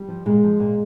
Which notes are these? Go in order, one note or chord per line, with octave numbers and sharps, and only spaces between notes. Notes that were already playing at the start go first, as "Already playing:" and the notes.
Already playing: G3
F3
A#2 G#3
F3
A#2